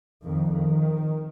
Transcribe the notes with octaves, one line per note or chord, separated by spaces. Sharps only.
F2 D#3
D#3